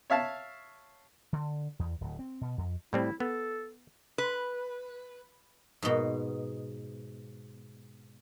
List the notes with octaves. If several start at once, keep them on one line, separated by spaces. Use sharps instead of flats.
C#5 E5 F5 A5
D3
E2
D1
C4
B2
F2
A2 G3 C4 E4
B3 A4
B4
G#2 B2